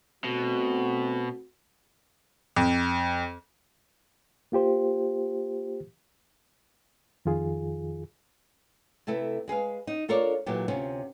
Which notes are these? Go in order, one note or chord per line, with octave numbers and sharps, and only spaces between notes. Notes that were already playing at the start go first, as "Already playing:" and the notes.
B2 A3 C4 F#4
F2
A#3 F4 G4 C5
F2 D#3 F4 G#4
C3 A3 E4 A4 B4
G#3 G#4 B4 F5
D#4
D4 F4 A4 A#4 C#5 D5
A#2 E3 F#3 A3 G4
D2 C3 C4 C#4 F4